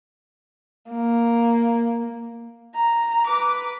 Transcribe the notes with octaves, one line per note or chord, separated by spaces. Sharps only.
A#3
A#5
B4 D6